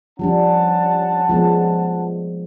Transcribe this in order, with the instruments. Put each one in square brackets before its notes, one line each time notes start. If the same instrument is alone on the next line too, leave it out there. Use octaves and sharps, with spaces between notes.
[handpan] F3 G3 D4 [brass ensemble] C#4 F#5 A5
[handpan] F3 G#3 B3